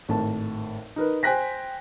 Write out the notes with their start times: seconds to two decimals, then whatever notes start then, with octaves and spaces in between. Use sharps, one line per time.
0.08 G#1 A2 A5
0.96 D#4 A#4 B4
1.23 C5 G5 G#5 F#6 A#6 B6